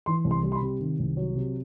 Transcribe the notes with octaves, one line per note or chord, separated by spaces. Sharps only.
E3 C6
C2
C6
G3
C6
B5
C3
D#3
C2
F#3
C3